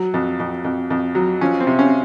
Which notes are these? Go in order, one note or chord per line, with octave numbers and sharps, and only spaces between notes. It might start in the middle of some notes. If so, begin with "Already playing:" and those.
Already playing: F#3
F2
F2
F2
F2
F#3
F3 C#4
C4
C3
C#4